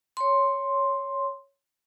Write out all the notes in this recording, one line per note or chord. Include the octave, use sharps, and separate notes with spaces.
C#5 C6